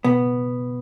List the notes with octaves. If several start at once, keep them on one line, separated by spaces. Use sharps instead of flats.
B2 B3